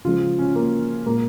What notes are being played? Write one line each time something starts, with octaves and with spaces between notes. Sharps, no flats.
C#3 F3 G#3 F4
C#4
A#3
A#2 G#3 A#3